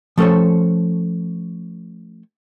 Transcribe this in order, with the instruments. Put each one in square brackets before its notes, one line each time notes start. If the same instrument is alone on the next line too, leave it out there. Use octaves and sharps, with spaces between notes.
[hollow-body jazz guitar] F3 A3 C#4 A4 C5 C#5